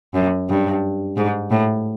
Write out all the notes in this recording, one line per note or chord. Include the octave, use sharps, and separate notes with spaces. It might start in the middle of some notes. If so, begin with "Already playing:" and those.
F#2
G2
G#2
A2